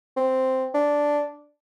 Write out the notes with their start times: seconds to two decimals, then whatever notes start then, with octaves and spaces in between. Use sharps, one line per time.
0.17 C4
0.75 D4